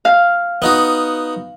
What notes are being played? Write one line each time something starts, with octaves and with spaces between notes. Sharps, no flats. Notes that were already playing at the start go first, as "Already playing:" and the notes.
F5
B3 D#4 F#4